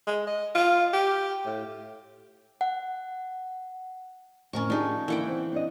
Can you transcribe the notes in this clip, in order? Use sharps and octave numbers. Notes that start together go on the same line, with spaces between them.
G#3
D#5
F4
G4
A2
F#5
F2 A2 C#4 A#4 C#6
F3 D4 D#4 G4 G#4 C#5
D3 E3 A#3 F#5 G5
C4
C4 D4 D#5